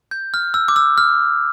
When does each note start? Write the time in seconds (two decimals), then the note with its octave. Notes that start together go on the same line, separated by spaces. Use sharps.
0.11 G6
0.34 F6
0.54 E6
0.68 D6
0.76 E6
0.98 F6